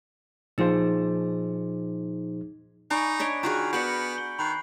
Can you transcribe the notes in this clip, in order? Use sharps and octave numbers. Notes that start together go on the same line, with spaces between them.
A#2 F3 D#4 G#4 C5
D#4 D5 G#5 B5 C#6
D4 C#5 D#5 B6 D7
D#3 F4 F#4 G#4
B3 F#4 A#4 D5 G6 C#7 F#7
G6 G7
D#3 B5 F#6 C7